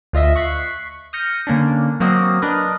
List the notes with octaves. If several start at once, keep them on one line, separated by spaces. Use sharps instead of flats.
D2 F4 D#5 E5
C#6 F#6 B6 C7
D#6 F6 G6 A#6 C#7 D#7
D3 A#3 C#4 D4
F#3 A#3 C4 F#4 D#5
D4 A#4 B4 D#5